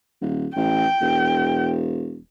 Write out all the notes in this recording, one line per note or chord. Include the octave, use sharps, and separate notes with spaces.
D#1
A1 G5
E1